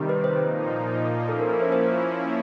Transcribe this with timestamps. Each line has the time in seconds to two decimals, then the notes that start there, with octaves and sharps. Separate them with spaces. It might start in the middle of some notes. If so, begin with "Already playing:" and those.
Already playing: C3 D#3 G3
0.09 B4
0.24 C5
0.38 A#2 F3 A#3 D#4
1.29 F3 A#3 C#4 E4 A4
1.40 A#4
1.50 A#4
1.62 C5
1.72 C5